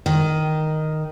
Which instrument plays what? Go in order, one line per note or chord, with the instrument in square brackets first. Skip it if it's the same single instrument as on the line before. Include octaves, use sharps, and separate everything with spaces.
[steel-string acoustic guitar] D#3